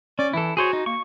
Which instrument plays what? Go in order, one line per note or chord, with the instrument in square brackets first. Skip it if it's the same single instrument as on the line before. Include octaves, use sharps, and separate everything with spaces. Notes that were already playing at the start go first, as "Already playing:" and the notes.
[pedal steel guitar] C#4 [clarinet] D5
[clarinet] E3 [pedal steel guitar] E4 A4
[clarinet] F#4 [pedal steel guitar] G#4 C5 C#5
[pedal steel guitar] D#4
[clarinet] A#3 [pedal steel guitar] C#6